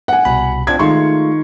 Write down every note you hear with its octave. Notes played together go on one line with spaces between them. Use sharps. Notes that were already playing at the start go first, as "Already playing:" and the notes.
F#5 G#5
C2 B2 B5
C4 D4 F4 G#6
D#3 G#3 A3 F4 C6 C#6